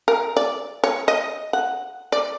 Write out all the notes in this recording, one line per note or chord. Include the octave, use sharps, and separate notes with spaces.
A#4
D5
C#5
D#5
F#5
D5